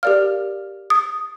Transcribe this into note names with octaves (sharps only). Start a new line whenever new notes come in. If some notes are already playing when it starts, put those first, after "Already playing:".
G4 A#4 D5 F5 F6
D#6